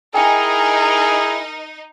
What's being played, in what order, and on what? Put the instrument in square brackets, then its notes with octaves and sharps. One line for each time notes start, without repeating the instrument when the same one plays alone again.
[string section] D#4 [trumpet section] E4 G#4 [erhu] A#4 [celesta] G5 G#5 C#7